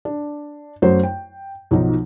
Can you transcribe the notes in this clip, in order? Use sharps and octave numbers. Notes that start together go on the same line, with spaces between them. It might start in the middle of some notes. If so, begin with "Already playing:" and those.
D4
F#2 F#3 A3 C5
G5
B1 F3 F#3 D#4